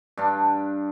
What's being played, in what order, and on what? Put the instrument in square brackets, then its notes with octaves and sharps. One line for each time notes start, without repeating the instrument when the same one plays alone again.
[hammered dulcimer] G2 D4